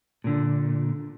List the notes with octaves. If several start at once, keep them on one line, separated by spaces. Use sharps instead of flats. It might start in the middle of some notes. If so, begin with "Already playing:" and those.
A#2 D3